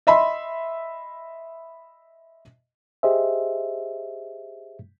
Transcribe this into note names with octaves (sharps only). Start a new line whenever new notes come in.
D#5 E5 B5 C6
G4 G#4 C5 D#5 E5